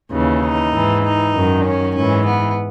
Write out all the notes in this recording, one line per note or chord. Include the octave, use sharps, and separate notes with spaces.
D#2 C#3 E3
D#4
G#2 E3
D#4
F#2 D#3
C#4
G#2 E3 C#4
B3